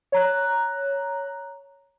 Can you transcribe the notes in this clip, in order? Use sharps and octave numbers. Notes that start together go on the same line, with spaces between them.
C#5 A#5 F#6